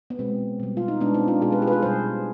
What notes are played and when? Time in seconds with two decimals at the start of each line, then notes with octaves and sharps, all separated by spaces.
0.10 B3
0.19 B2 G#3 C4
0.60 B2 G3
0.77 F4
0.88 D#4
1.00 B2 G#3 B3 D4
1.14 C4 D#4
1.28 D4 F4
1.42 B2 G#3 F4 G#4
1.52 G4 B4
1.62 F4 G#4
1.67 B4
1.72 F4 G#4
1.82 B2 G3 G#4 C5